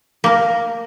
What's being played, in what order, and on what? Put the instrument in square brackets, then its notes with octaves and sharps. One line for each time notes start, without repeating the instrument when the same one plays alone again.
[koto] A#3 A#4